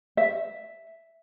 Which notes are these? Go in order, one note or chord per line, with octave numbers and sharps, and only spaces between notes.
E5